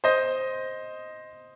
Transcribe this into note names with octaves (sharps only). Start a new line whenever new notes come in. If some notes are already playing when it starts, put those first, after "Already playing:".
C5 D#5